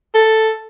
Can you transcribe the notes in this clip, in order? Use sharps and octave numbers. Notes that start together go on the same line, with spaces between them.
A4